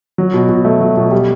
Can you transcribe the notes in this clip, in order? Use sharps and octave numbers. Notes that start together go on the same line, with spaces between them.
F#3
B2
B2
A3
F#3
B2
G3